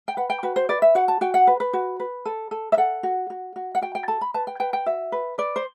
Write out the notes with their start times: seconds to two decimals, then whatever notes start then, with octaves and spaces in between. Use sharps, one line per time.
0.08 G5
0.17 B4 F#5
0.30 G5
0.43 F#4 B4
0.56 C5
0.69 B4 D5
0.82 E5
0.95 F#4 F#5
1.08 A5
1.21 F#4 G5
1.34 F#5
1.47 B4
1.60 B4
1.73 F#4
2.00 B4
2.25 A4
2.51 A4
2.72 E5
2.77 A4 F#5
3.03 F#4
3.30 F#4
3.56 F#4
3.75 F#5
3.82 F#4 G5
3.95 G5
4.08 A4 A5
4.21 B5
4.34 B4 A5
4.47 G5
4.60 B4 G5
4.73 G5
4.86 F#4 E5
5.12 B4
5.38 B4 D5
5.56 C5